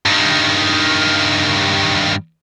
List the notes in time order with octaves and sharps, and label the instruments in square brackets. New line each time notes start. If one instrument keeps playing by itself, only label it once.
[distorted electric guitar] G2 D#3